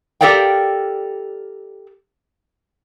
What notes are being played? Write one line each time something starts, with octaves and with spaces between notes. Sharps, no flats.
G4 A4 A#4 D5 F5 G5